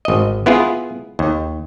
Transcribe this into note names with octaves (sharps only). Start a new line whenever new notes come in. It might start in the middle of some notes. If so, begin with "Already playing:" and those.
G#1 D#5
B3 E4 F4 G#4
D#2